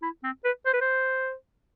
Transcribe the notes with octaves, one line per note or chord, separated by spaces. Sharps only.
E4
C4
B4
C5
B4
C5